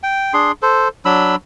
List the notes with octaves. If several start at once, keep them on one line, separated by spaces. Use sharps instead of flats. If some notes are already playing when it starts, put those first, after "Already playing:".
G5
D4 G#4 C6
A4 C5
F#3 D4 B5 E6